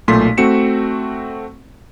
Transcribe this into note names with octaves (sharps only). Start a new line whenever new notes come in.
B1 A#2 A3 C6 B6
A3 C4 F#4 C#7 E7